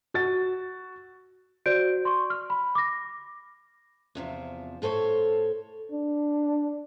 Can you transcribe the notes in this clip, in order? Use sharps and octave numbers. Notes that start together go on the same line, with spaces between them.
F#4 A6
F#4 C5 D5 G6 D7
C6 C#6
F6
B5
D6 A#6
E2 C3 F3
A2 A4 C5 C#5
D4